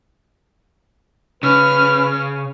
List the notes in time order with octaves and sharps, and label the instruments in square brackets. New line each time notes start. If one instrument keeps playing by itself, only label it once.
[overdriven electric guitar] C#3 [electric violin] C#4 F6 [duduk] B4